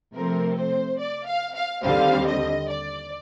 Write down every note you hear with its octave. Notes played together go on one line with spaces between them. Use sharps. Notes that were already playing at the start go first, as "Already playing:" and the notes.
C3 F3 A3 C4 A#4
C5
D5
F5
F5
D#2 D3 G3 C4 F5
D#5
D5